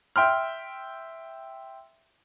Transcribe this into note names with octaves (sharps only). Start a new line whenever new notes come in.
E5 G5 C6 F6